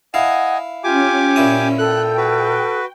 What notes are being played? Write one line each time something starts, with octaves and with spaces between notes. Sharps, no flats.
E4 D#5 F5 F#5 G#5
C#4 F4 G4 G#5 D6
A#2 E4 D#6
A4 G5 F#6
F#4 B4